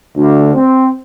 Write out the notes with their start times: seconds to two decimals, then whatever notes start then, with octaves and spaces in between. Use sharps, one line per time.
0.16 D2
0.55 C4